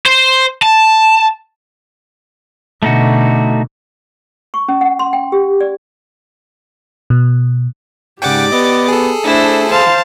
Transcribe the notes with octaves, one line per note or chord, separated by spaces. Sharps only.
C5
A5
B2 D3 A3 D#4 F#4
C#6
C#4
F#5
C6
G5
G4
D5
B2
G#2 C#3 G4 D5 F#5 G5 D6
B3 D#5
G#4 A4
A3 D4 E4 C5
C5 F5 A5